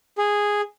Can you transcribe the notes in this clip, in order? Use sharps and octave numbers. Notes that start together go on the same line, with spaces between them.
G#4